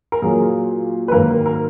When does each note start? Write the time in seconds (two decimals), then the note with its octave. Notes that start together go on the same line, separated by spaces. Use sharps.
0.12 A#4
0.22 A#2 F#3 G#4
1.08 B4
1.12 G#2 D#3 F#3 A#3 A#4
1.46 A#4